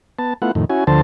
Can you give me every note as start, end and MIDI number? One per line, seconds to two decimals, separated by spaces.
0.19 0.34 59
0.19 0.34 81
0.42 0.52 57
0.42 0.52 59
0.42 0.52 64
0.42 0.52 65
0.42 0.52 78
0.55 0.65 41
0.55 0.65 45
0.55 0.65 51
0.70 0.84 61
0.70 0.84 64
0.70 0.84 66
0.70 0.84 80
0.87 1.01 38
0.87 1.01 50
0.87 1.01 53
0.87 1.01 69
0.87 1.01 72
0.87 1.01 81